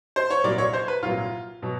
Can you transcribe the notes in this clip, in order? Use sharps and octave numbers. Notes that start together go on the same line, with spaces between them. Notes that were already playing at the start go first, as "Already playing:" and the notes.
C5
C#5
C2 A#2 F#3 D5
C#5
C5
B4
C2 A#2 F#3 F4
B2 F#3